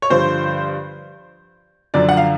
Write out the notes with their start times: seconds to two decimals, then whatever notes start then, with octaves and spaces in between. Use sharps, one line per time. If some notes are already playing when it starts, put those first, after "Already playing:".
0.02 C#5
0.10 G2 D3 F3 C5
1.94 F#2 D3 F3 D5
2.09 F#5
2.17 F5